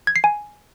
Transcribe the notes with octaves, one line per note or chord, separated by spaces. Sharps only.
G#6
C7
G#5